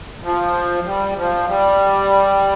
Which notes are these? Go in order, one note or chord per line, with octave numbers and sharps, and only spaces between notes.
F3
G3
F3
G3